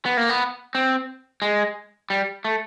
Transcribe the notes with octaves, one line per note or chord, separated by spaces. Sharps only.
B3
A#3
B3
C4
G#3
G3
A3